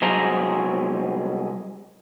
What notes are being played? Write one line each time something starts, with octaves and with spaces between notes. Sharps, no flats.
C2 F#3 G#3 G#4 C5 A#5